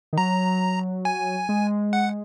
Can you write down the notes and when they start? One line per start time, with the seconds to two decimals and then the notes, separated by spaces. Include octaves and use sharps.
0.13 D#3
0.18 F#3 A#5
1.05 G#5
1.49 G#3
1.93 F#5